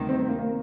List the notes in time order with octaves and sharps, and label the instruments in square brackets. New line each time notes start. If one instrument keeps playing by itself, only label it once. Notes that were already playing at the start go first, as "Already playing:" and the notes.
Already playing: [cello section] D2 C3 D#3 G3
[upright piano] C4
C4
A#3
A#3